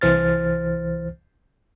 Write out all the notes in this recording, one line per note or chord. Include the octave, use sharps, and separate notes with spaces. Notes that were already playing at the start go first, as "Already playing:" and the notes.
C2 E3 C5 F6 A6